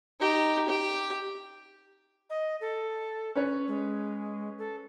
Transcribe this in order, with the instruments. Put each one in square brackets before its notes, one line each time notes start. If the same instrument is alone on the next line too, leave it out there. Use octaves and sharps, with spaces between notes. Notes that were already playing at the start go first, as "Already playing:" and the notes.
[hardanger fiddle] D#4 G4
G4
[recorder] D#5
A4
[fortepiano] C#4 B4 C#5
[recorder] G#3
A4